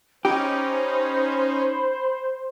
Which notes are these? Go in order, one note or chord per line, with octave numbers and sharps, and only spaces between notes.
C#4 D#4 G4 C5 B5